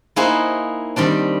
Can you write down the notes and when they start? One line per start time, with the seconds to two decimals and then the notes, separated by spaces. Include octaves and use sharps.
0.16 A#3 D#4 E4 G#4 C5 F#5
0.96 D#3 G3 C4 D4